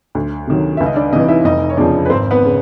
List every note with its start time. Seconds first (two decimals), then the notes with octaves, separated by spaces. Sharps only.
0.15 D2
0.47 C3 D#3 F#3
0.77 C#2 E5
0.86 D#5
0.96 D4 D5
1.12 C3 D#4 D#5
1.15 E3
1.28 E4 E5
1.44 F1 D#4 D#5
1.70 C#5
1.77 E2 C#3 F3 D4 D5
2.05 B4
2.10 G#1 C4 C5
2.31 B3 B4
2.45 C#3